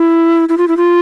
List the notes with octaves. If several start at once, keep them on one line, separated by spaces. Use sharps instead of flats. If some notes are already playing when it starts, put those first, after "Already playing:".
Already playing: E4
E4
F4
E4
F4